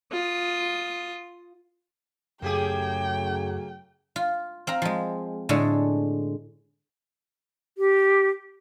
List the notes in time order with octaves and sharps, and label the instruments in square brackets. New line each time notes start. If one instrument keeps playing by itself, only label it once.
[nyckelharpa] F4 D#6
[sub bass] F#2 [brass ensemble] C#3 F#3 A3 [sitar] A#3 G4 G#4 [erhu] G5
[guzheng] F4
C4 F5 A#5
F3 G#3
A2 D3 G#3 G#4 A4
[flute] G4